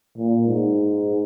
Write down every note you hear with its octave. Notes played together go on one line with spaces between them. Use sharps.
A#2
G#2